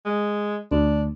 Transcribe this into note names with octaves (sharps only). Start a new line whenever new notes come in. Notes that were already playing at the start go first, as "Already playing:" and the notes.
G#3
D2 D4